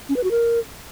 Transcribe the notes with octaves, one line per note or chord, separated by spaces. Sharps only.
C#4
B4
F#4
A#4